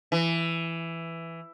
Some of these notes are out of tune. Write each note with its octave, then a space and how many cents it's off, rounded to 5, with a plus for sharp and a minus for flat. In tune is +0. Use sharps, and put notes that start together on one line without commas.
E3 +10